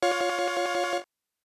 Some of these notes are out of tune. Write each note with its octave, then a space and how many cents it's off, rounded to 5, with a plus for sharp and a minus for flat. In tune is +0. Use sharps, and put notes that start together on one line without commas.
F4 +10 C#5 +15 F5 +30